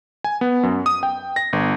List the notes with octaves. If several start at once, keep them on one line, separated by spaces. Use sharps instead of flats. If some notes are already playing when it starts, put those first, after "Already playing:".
G#5
B3
F#2
D#6
G5
A#6
G1